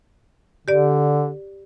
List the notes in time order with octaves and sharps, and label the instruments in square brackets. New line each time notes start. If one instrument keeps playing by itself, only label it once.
[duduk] D3 [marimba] G4 D5